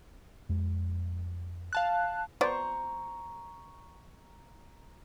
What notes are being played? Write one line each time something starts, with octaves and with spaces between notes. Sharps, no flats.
F2 G#3
F5 A5 F#6
B3 C5 D5 A#5 C#6